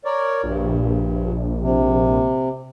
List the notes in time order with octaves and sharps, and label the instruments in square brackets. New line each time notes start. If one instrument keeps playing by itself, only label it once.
[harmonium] A#4 C#5 D5
[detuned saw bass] A#1 [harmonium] G2
[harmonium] C3